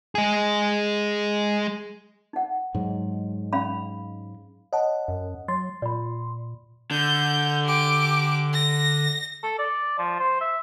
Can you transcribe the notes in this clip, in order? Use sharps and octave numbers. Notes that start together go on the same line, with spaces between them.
G#3 G#4
D#4 F#5
G#2 F#3 G#3
C#4 F5 B5
C#5 D#5 F#5 A5
F#2
F#3 C6 A6
A#2 D5 B5
D3 G6
G4 D6
A#6
A4
D5
F3
C5
E5